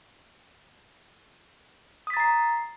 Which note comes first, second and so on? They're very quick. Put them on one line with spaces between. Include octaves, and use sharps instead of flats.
D#6 B6 A6 A#5 C7